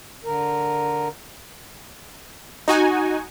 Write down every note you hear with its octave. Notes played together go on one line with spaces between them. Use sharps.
D3 A#4
D#4 F#4 G#5